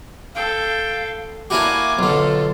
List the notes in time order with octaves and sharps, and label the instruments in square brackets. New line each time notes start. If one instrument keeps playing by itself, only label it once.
[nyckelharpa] A4 G5 [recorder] F5
[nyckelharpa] A#3 G#5 [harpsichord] D4 E4 F#4 [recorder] D6
[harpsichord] B1 D3 [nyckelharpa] F4 A4